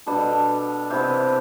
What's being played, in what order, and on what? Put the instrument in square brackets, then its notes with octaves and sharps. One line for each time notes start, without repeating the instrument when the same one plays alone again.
[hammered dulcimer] B2 G3 B3 D4 A4
C3 E3 B3 E4 G4